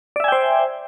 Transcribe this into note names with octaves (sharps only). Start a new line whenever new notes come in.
C5 D5 E5 G5 G#5